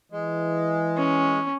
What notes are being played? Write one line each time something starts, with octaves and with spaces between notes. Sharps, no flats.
E3 G#3
C#4